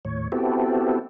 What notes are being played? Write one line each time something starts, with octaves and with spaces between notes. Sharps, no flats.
D#2 A2 C#5
B3 C4 E4 F#4 G4 A4